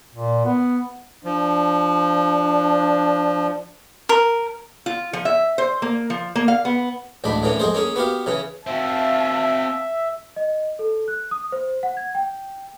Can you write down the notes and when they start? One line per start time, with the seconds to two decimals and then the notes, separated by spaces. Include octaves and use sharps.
0.15 A#2
0.45 B3
1.25 F3 D4
4.09 A#4
4.86 F4
5.13 F3
5.25 E5
5.58 C5
5.82 A#3
6.10 F3
6.35 A#3
6.48 F5
6.65 B3
7.24 A1 D2 G#3 D4 B5
7.43 A2 D3 E3 A#3 C#4
7.60 F2 G#3 G#4 C5
7.74 A#3 C#4 G#4
7.96 B3 F#4 G4 F5
8.26 C#3 E3 C#4
8.67 C4 F#4 E5 F5 A5
10.36 D#5
10.79 A4
11.08 F#6
11.31 D#6
11.52 C5
11.83 F#5
11.97 G#6
12.15 G5